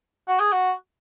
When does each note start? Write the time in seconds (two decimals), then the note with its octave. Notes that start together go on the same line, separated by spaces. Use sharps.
0.28 F#4
0.40 G#4
0.52 F#4